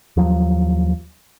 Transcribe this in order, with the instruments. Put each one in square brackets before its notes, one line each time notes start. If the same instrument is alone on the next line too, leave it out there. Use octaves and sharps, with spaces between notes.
[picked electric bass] D#2 F3 F#3